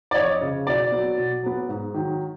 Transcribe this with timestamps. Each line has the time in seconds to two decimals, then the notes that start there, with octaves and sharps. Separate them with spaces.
0.11 D5
0.15 F2 C#5 D#5
0.41 C#3 F3
0.67 B2 D5
0.92 F#3 B3
1.17 B2
1.43 F#3 B3
1.69 G#2
1.94 D#3 F#3